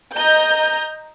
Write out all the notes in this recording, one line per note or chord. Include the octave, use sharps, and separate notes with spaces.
D#5 A#5 G6